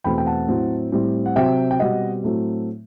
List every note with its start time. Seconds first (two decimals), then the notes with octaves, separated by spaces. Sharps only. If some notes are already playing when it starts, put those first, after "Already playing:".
0.04 E2 B2 A3 C4 G5 B5
0.18 G5
0.26 F#5 A5
0.48 A2 F#3 C4
0.92 A2 G3 C4
1.26 F#5
1.36 C3 F#3 C4 E5 G5
1.71 G5
1.79 B2 G3 C4 D#5 F#5
2.23 A2 F#3 A3 C4